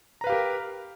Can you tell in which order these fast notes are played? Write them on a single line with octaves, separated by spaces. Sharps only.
A#5 B4 F5 G4 A#4